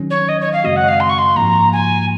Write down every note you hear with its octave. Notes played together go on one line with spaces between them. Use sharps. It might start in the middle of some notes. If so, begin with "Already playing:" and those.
Already playing: D#3 F#3 C#4
C#5
D#5
C#5
F5
F#2 C#3 G#3 C4 F#4 D#5
F#5
F5
C6
C#6
C6
G#2 F3 A#3 A#5
G#5